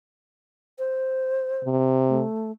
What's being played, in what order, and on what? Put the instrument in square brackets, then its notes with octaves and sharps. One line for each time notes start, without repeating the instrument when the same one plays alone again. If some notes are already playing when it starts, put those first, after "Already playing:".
[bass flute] C5
[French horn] C3
[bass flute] A3